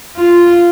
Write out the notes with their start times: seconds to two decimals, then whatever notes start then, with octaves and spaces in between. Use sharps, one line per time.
0.17 F4